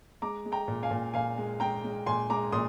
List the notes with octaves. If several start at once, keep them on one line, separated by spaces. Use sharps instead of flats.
G#3 A#5 D6
G#3
G5 A#5
A#2
F5 G#5
A#2
A#2 F5 G#5
G#3
G#3 G5 A#5
G#3
A#2 G#5 C6
G#3 A#5 D6
A#2 C6 D#6